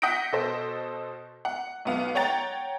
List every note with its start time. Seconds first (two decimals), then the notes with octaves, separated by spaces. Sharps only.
0.02 F#5 D#6 G6 A#6 B6 D7
0.32 B2 A4 C5
1.45 F#5
1.85 B1 B3 F5
2.15 C#5 F#5 G5 A#5 A6